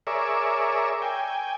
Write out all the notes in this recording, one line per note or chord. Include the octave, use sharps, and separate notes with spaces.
G#4 A#4 C#5 D5 E5
G5 G#5